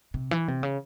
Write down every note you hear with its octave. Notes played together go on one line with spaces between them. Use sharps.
C3
E3
C3
C#3